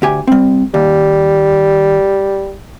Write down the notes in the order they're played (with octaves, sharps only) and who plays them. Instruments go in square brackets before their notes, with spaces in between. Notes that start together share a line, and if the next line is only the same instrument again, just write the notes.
[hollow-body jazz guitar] D2 G4 G#5
G3 C4
[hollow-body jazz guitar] D#2 [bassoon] G3